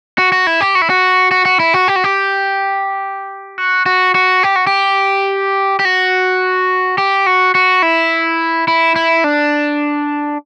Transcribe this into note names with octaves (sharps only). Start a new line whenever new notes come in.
F#4
F#4
E4
G4
F#4
E4
F#4
F#4
F#4
E4
F#4
G4
F#4
G4
F#4
F#4
F#4
G4
F#4
G4
G4
F#4
G4
F#4
F#4
E4
E4
E4
D4